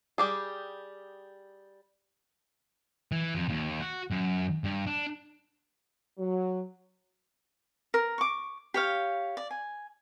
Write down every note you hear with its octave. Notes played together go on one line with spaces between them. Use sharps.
G3 G4 G#4
E3
F2
D#2
F#4
F#2
G2
D4
F#3
A#4
C#6 D6
G4 C#5 F5
D5
G#5